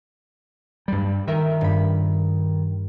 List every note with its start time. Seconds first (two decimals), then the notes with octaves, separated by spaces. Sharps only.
0.88 G2 G3
1.27 D#3 A#4 E5
1.61 G2 B5